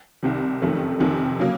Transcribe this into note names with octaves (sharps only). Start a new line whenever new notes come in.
C2 C3 D#3
F#1 F2 C3 D#3 A3
F1 F2 C3 D#3
C#3 F#3 A#3